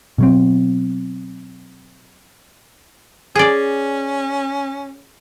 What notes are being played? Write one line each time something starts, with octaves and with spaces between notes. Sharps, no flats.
B2 F#3 C4
C#4 G#4 D5